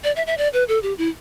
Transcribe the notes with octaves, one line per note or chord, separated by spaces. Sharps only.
D5
E5
E5
D5
B4
A4
G4
E4